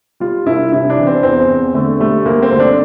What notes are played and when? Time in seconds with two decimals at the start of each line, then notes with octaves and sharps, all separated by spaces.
0.20 G3 F4
0.46 C2 E4
0.72 C3 E4
0.90 D4
0.98 E3
1.07 C4
1.23 E2 C4
1.48 E2
1.74 D3 A3
2.00 G3 A3
2.25 D2 A#3
2.42 C4
2.52 D2
2.60 D4